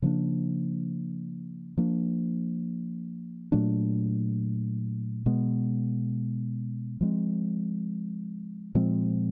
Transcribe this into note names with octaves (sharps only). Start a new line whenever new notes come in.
C#3 F3 A#3 D4
F3 A#3 D4
A#2 F#3 A3 D4
B2 G#3 B3
F3 G#3 C4
A#2 F3 G#3 C4